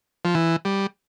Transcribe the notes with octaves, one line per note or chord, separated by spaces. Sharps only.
F3
E3
G3